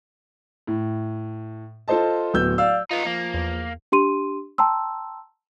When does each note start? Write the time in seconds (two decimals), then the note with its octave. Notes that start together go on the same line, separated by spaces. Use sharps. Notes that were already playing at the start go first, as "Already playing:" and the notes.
0.67 A2
1.88 F4 A4 C5 D#5 A5
2.34 D1 B3 E6 G6
2.58 D5 F5 E6
2.91 B3 D#4 F4
3.05 F3 A#3
3.34 E2
3.92 D4 G4 C6 D#7
4.58 G5 A5 A#5 C6 E6